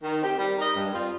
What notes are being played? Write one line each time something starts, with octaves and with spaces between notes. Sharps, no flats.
D#3
C4 G4
G3
D#4 A#4 D#5
G2
G3 C4 F4